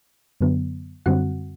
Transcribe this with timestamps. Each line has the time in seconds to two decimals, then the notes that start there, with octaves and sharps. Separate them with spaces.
0.41 F#2 D3 F#3 B3
1.06 F#2 D3 G3 C4 F#4 F#5